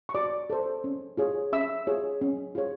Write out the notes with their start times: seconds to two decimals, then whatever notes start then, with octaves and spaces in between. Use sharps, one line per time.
0.09 C#6
0.14 F#4 D5 D6
0.50 A4 C5
0.84 C#4
1.17 F4 G#4 C#5
1.52 C#4 E5 E6
1.87 F4 G#4 C#5
2.21 C#4
2.55 F4 G#4 C#5